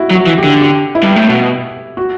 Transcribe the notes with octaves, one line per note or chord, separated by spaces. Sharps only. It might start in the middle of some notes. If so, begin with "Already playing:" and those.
Already playing: E4 F#4
F#3
F#4
E3
G4
D3
G4
E4
G2
A2
B2
F#4